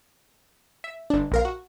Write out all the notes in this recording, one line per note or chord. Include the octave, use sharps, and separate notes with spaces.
E5
G1 D4
A#1 A#4 F5
F#4